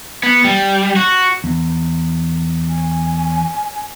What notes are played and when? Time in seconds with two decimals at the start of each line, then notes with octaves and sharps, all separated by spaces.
0.23 B3
0.45 G3
0.96 F#4
1.44 E2
2.69 G#5